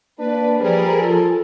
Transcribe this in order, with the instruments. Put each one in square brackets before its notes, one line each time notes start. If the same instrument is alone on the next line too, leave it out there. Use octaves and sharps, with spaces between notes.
[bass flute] A#3 [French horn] D4 [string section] B4
[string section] F3 G#4 A#4 [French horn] G3 [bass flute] C5
[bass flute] F4 [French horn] A4